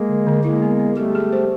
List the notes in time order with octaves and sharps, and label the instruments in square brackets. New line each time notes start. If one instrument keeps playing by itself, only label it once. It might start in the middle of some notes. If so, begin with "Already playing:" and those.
Already playing: [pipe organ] G#3 A#3
[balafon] D3
D3
[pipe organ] G#3 A#3 [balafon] E4
[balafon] B3
B3
[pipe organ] G3 A3 [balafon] G#4
[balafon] G#4
C5